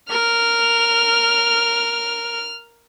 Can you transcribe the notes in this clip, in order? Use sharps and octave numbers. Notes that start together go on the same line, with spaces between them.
A#4 F6